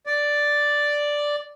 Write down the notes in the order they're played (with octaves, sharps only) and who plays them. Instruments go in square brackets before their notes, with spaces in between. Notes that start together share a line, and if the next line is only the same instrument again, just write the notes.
[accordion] D5